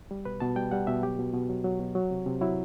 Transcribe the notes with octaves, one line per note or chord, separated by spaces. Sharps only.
G3
B2 B4
B2 A5
G3 G5
G3 F#5
B2 E5
F#3 G4
B2
B2
F#3
F#3
B2
F#3
C3
C3
F#3 E4